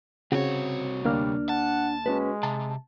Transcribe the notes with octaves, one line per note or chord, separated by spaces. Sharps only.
C2 C#3 C4 F#4 C#5
D2 G3 A#3 D4 F6
F#5 A5
G#3 C#4 F#4 B4
C3 A5